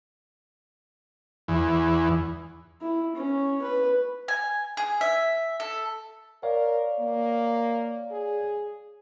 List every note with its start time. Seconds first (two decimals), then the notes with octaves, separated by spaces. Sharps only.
1.48 E2
2.82 E4
3.16 C#4
3.62 B4
4.28 G#5
4.77 G#4
5.01 E5
5.60 A4
6.43 A#4 C#5 D5 F5
7.00 A#3
8.11 G#4